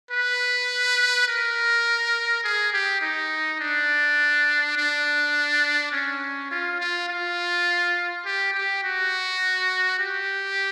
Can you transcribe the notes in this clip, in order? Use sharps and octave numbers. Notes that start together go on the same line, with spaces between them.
B4
A#4
G#4
G4
D#4
D4
D4
C#4
F4
F4
F4
G4
G4
F#4
G4